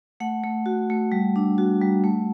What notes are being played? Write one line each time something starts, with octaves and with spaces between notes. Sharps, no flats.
A3 F#5
A3
F#4
A3
G3
D4
F#4
G3
A3